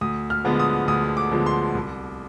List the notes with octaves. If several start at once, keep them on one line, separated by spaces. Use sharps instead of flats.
D2 D#6
F6
D3 F3 G#3 B3
D#6
D2 D#6
D6
D3 F3 G#3 B3
C6
C2